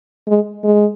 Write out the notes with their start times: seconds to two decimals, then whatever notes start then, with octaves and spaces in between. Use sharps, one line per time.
0.28 G#3
0.64 G#3